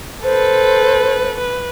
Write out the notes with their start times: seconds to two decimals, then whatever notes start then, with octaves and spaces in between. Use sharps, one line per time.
0.24 A4 B4 C5
1.38 B4